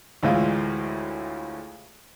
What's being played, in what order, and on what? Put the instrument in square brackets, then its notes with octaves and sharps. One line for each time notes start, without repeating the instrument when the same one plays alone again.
[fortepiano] D2 A2 E3 G#3 F4 F5